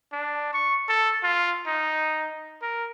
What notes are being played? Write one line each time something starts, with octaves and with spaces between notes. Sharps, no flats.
D4
C#6
A4
F4
D#4
A#4